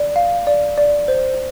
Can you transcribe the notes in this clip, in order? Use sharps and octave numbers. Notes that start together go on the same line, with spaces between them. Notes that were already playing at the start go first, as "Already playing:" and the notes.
Already playing: D5
F5
D5
D5
C5